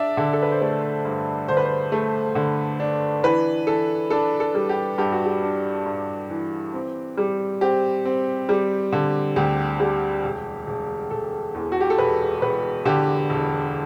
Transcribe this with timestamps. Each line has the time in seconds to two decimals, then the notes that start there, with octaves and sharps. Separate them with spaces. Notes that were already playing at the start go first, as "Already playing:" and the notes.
Already playing: D4 D5 E5
0.17 D3
0.33 A4
0.42 B4
0.52 C5
0.61 A3 D5
1.05 G2
1.48 D3 C5
1.57 B4
1.65 C5
1.92 A3
2.35 D3
2.80 D4
3.23 E3 B4
3.67 E3 A4
4.10 D4 A4
4.40 A4
4.55 G3
4.69 G4
4.98 G2 G4
5.12 F#4
5.26 G4
5.42 D4
5.86 G2
6.30 E3
6.74 C4
7.17 G3
7.61 C4 G4
8.05 C4
8.49 G3
8.93 D3
9.36 D2 G4
9.80 G3
10.24 E1
10.67 E1
11.10 E1 A4
11.55 E2
11.72 F#4
11.81 G4
11.90 A4
11.99 E1 B4
12.42 E1 B4
12.85 D3 G4
13.30 E1